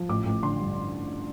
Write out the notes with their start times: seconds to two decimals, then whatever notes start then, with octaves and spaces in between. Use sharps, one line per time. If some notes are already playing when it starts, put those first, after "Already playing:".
Already playing: F3
0.09 A1 D6
0.26 A1
0.42 D3 C6
0.60 G2